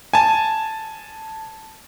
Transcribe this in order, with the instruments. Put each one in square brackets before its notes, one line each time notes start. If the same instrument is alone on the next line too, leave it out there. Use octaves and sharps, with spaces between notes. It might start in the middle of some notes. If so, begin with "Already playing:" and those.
[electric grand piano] G#5 A5